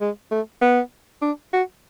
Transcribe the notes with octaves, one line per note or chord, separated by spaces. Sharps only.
G#3
A3
B3
D4
F#4